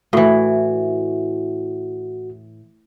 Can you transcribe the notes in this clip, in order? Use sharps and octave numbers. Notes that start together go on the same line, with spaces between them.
A2 E3 F#4